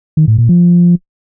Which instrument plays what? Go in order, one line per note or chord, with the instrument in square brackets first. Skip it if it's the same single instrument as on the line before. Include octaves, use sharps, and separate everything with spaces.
[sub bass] D#3
A2
A#2
F3